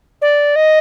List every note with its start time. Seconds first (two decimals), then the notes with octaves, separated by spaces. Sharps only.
0.22 D5
0.56 D#5